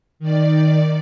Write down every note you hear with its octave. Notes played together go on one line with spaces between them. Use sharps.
D#3 D5